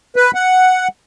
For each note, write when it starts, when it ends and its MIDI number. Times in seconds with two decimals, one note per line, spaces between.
0.16 0.31 71
0.35 0.88 78